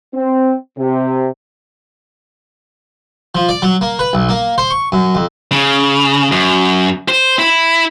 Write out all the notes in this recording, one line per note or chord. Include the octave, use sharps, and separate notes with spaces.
C4
C3
F3
D5
F#3
A#3
B4
B1
A#3
C5
C#6
F#2
F2
C#3
F#2
C5
E4